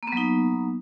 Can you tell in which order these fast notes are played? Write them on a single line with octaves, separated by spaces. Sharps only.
A#3 B3 F#3 D#4